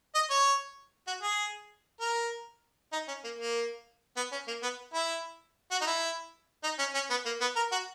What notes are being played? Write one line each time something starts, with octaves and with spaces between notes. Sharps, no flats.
D#5
C#5
F#4
G#4
A#4
D#4
C#4
A#3
A#3
B3
C#4
A#3
B3
E4
F#4
D#4
E4
D#4
C#4
C#4
B3
A#3
B3
A#4
F#4